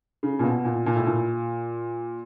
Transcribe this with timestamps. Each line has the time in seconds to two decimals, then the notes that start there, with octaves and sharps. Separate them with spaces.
0.23 C#3
0.39 A#2
0.43 B2
0.65 A#2
0.86 A#2
0.96 A2
1.06 A#2